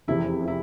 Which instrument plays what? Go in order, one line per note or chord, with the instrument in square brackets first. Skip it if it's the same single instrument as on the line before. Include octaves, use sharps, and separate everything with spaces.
[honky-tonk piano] F1 E2 C3 [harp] E4
[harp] E4